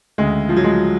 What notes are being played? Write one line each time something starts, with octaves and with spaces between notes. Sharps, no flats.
D2 C#3 G#3
F3
F#3
G#3